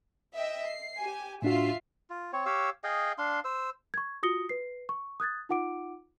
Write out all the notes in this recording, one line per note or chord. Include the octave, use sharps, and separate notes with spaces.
D#5 E5 G5
C7
G4 G#5
A2 D4 F4 F#4 E5 C7
F4
C4 C#5
G4 C#5 F5 E6
G#4 D#5 F5 G5
D4 F5 C6
C5 E6
C#6 G#6
F4 F#4 D#6 A#6 C#7 G7
B4 C7
C#6
D#6 F#6 G#6 A6
D#4 F4 F#5 D6 D7